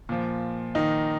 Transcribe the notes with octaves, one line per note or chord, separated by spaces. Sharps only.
A#2 F3
D#3 D#4